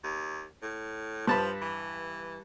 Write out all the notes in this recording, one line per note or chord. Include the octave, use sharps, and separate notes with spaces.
D#2
A2
G2 F3 A5 B5
E3